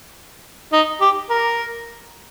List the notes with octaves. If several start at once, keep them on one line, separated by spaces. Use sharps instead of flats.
D#4
G4
A#4